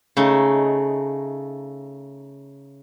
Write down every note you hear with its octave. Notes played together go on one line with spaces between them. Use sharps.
C#3 A3 D#4